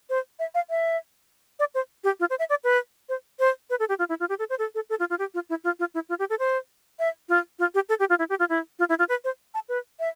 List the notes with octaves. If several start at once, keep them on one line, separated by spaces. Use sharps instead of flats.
C5
E5
F5
E5
D5
C5
G4
F4
C5
E5
D5
B4
C5
C5
B4
A4
G4
F4
E4
F4
G4
A4
C5
A4
A4
A4
F4
F4
G4
F4
E4
F4
F4
E4
F4
G4
A4
C5
E5
F4
F4
G4
A4
G4
F4
E4
G4
F4
E4
F4
E4
F4
B4
C5
A5
B4
E5